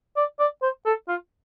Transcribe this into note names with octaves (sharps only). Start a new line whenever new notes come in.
D5
D5
C5
A4
F4